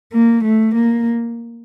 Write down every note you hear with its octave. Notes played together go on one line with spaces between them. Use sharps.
A#3
A3
A#3